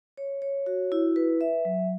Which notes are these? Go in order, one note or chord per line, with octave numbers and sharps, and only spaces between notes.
C#5
C#5
F#4
E4
B4
E5
F#3